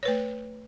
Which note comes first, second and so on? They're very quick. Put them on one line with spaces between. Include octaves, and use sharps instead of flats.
C#5 B4 A3